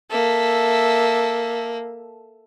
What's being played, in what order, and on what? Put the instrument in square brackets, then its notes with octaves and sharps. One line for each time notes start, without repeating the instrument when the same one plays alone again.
[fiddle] A#3 [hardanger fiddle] A4 E5